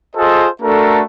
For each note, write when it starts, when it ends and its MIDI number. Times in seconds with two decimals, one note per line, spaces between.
0.15 0.48 65
0.15 0.48 68
0.15 0.48 69
0.15 0.48 72
0.15 0.48 75
0.62 1.02 57
0.62 1.02 62
0.62 1.02 66
0.62 1.02 69
0.62 1.02 70